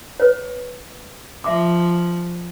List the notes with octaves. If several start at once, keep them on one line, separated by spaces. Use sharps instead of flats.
B4 C#5
F3 E5 D6